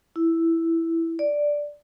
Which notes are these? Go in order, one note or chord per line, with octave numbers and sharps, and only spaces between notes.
E4
D5